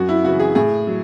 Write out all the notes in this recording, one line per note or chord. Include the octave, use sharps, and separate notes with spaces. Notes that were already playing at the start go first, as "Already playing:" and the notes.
Already playing: F#2 F#4
E4
C#3 E3 F#4
G#4
A2 G#4
F#3